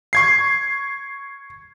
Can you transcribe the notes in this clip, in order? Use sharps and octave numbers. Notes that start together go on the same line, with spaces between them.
C#6 G#6 C7